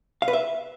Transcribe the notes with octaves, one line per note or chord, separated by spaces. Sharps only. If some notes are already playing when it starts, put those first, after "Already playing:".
F5
B4
E5